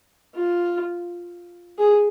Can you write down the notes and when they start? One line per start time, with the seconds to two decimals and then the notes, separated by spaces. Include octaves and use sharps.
0.35 F4
1.78 G#4